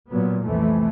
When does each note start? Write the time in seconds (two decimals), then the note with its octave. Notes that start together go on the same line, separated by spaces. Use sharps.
0.10 A#2 F#3 B3
0.43 C2 F2 E3 A3